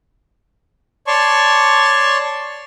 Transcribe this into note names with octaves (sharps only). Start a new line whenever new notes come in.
C#5 D5 A5 C6 C#6